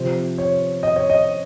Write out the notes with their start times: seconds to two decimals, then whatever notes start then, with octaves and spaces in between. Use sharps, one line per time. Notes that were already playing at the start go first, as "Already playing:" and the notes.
Already playing: C3 F3 C5
0.38 C#5
0.83 D#5
0.96 C#5
1.10 D#5